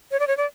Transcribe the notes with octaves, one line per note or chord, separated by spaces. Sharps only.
C#5
D5
C#5
D5